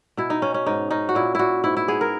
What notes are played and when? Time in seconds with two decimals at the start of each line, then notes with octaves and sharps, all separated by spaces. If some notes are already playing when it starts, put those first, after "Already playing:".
0.17 B2 E4
0.30 D#4
0.42 B2 C#4
0.54 C#4
0.66 G#2 D#4
0.91 C#4 D#4
1.09 F#4
1.15 A#2 E4
1.35 A#2 E4 F#4
1.64 G#2 E4
1.77 E4
1.88 B3 G#4
2.01 A#4